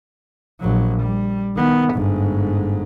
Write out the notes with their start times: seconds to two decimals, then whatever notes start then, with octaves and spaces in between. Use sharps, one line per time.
0.61 A#1 F#3
1.00 G3
1.56 D#3 B3
1.94 G1 G#2